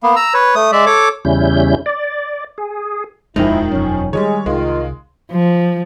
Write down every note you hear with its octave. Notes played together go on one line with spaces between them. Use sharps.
A#3 B3
A#5 E6
B4 C#5
A3 D#6
G#3 D5 E5
A4 C#5 D6
E2 C#3 G3 C#4 E4 G6
D5
G#4
D#1 F2 G#2 D#3 F3 G#3 D#4 E4
E1 F#2 C#4
D#3 E3 G3 G#3 C#5
C2 D#3 G#3 F4
F3